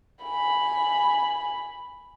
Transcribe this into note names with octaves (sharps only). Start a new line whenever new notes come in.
G#5 B5